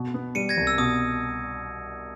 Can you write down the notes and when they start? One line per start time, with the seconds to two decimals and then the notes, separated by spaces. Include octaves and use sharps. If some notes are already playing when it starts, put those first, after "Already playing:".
Already playing: B2
0.14 B3
0.35 G3 C#7 D#7
0.49 G#6 A#6
0.57 C2
0.67 E6
0.78 B2 D#6